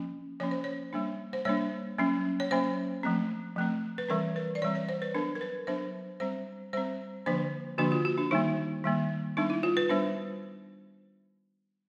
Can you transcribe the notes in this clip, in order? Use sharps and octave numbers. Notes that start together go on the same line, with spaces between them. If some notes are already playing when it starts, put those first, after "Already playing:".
Already playing: F3 A#3 C#4
F3 A#3 C#4 C#5
C5
C#5
G3 A#3 D4
C5
G3 A#3 D4 C#5
F#3 A#3 C#4
C#5
F#3 A#3 C#4 C5
F3 A3 C4
F3 A3 C4
B4
E3 G3 C4 A#4
B4
D5
E3 G3 C4 C#5
C#5
C5
B4
F#3 B3 D4 A#4
A#4
B4
F#3 B3 D4 C5
G3 C4 C5
G3 C4 C5
D3 F3 A#3 D4 C5
D3 F3 A#3 D4 F#4
F4
F#4
D4
D#3 G3 A#3 D#4
D#3 G3 A#3
G3 B3 D4 D#4
E4
F4
B4
G3 B3 D4 C5